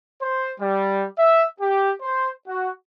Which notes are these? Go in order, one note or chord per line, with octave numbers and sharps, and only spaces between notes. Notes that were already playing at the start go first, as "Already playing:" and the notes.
C5
G3
E5
G4
C5
F#4